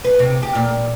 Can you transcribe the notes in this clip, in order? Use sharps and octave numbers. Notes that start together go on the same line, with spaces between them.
B4
C3
G4
A#2